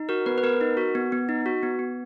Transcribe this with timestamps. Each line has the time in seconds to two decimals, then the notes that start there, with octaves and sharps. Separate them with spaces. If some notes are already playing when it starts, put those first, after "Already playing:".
Already playing: D#4
0.09 F#4 A#4
0.26 B3 B4
0.38 B4
0.43 B3 A#4
0.61 D#4
0.77 F#4
0.95 B3
1.12 B3
1.29 D#4
1.46 F#4
1.63 B3
1.79 B3